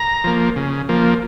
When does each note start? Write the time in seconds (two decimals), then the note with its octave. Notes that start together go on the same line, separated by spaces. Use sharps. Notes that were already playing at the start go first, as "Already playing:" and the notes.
Already playing: A#5
0.24 F3 A#3
0.56 C#3
0.89 F3 A#3